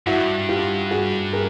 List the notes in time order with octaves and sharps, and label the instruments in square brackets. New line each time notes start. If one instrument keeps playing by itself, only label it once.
[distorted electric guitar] G2 [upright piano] E4 F#4
[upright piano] F4 G4
F#4 G#4
G#4 A#4